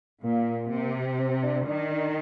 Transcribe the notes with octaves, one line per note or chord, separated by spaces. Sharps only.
A#2 A#3
C3
C4
D4
D#3 D4
D4